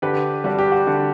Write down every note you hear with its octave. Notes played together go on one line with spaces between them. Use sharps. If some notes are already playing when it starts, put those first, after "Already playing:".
D3 G4 B4
G3 D4 F#4
G4
F#4
D3